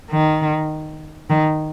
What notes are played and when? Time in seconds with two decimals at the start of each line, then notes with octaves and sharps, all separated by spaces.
0.11 D#3
1.30 D#3